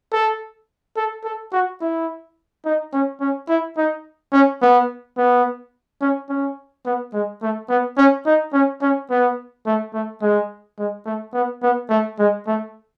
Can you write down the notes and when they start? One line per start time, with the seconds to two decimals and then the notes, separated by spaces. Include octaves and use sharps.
0.12 A4
0.97 A4
1.24 A4
1.52 F#4
1.81 E4
2.65 D#4
2.93 C#4
3.21 C#4
3.49 E4
3.77 D#4
4.33 C#4
4.62 B3
5.18 B3
6.01 C#4
6.29 C#4
6.86 B3
7.14 G#3
7.42 A3
7.69 B3
7.97 C#4
8.26 D#4
8.53 C#4
8.82 C#4
9.11 B3
9.67 A3
9.94 A3
10.22 G#3
10.79 G#3
11.06 A3
11.34 B3
11.62 B3
11.90 A3
12.19 G#3
12.47 A3